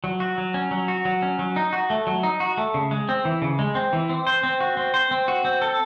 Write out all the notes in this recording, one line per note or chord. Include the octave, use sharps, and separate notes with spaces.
F#3
F#4
F#3
C#4
F#3
F#4
F#3
C#4
F#3
D#4
F#4
A3
F#3
D#4
F#4
A3
C#3
G#3
C4
E3
C#3
G#3
C4
E3
C4
C5
C4
F#4
C4
C5
C4
F#4
C4
A4